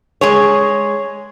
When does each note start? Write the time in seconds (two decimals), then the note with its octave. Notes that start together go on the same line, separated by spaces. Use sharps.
0.21 G#3 G#4 C#5